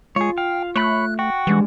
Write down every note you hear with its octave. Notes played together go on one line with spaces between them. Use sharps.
G#3 F4 G#4 C#5
F5 G5
A3 C#5 B5 F#6
F#4 G5
E3 G3 G#3 D4